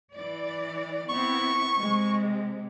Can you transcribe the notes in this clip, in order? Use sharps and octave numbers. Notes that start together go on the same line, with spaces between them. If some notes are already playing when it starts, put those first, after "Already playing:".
E3 D5
B3 C4 E4 C#6
C3 G#3